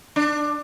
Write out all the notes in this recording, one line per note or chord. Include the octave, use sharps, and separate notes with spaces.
D4